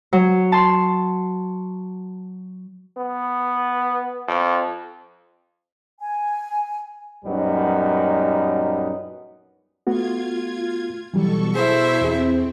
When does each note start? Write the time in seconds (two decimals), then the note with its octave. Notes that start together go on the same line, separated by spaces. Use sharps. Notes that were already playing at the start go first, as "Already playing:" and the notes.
0.13 F#3
0.52 A5 C6
2.97 B3
4.28 F2
6.01 G#5
7.25 A#1 F#2 F#3 G3 B3 D#4
9.87 A3 B3 F4 F#4 G#6
11.14 B2 E3 F#3 G3 A4 C#6
11.55 E4 G#4 C5 E5
12.01 E2 C4 G#4